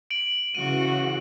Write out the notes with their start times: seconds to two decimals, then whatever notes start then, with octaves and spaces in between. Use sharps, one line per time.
0.10 D7 F#7
0.55 C#3 E3 F#4 D#7